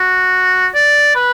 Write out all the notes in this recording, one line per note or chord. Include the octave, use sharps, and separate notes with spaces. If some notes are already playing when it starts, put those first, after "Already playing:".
Already playing: F#4
D5
B4